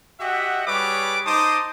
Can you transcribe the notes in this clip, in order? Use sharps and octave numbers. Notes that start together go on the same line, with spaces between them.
F#4 G4 D#5 E5 F#5
G3 G#4 B4 C#5 D6
D#4 C5 A5 D6 D#6